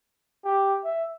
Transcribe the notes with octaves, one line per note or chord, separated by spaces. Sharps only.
G4
E5